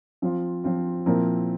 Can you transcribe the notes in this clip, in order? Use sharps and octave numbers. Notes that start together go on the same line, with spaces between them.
F3 C4 F4
F3 C4 F4
A#2 F3 C4 E4 A#4